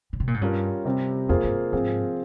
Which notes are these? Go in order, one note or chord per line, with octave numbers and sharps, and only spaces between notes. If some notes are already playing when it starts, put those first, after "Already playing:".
C#3
C3
A#2
G#2
G2 G3 C#4 F4 A#4 C#5
C3 G3 C4
F2 A#3 F4 G#4 C5
G2
G#2 F3 C4 F4 G#4